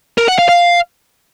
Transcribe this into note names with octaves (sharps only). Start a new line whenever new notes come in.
A#4
F#5
F5
F5